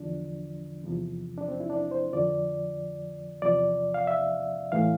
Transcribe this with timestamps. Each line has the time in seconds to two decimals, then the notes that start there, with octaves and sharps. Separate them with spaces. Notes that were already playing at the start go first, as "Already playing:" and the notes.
Already playing: E2 D3 F3 D4
0.84 E2 C3 F3
1.37 D4
1.48 C4
1.60 E4
1.70 D4
1.91 C5
2.13 F2 D3 F3 D5
3.42 E2 C3 F3 D5
3.94 F5
4.07 E5
4.72 A2 E3 F5